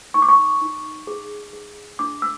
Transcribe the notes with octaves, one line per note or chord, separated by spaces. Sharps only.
D#4 C#6
D6
C#6
D#4
G#4
G#4
D4 D6
E6